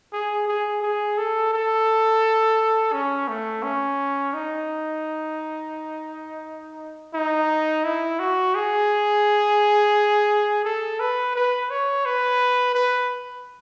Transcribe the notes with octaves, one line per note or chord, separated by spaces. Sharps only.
G#4
G#4
G#4
A4
A4
C#4
A3
C#4
D#4
D#4
E4
F#4
G#4
A4
B4
B4
C#5
B4
B4